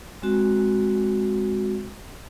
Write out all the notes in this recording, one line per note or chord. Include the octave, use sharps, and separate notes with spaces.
G#3 C4 F#4